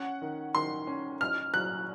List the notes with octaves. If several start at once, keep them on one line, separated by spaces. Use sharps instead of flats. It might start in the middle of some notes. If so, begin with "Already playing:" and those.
Already playing: C#4 F#5
D#3
D#3 C6
C#4
D#4 F6
F#3 F#6